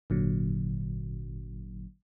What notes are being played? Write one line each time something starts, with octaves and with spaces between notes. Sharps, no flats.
G#1 A#2 D3 F#3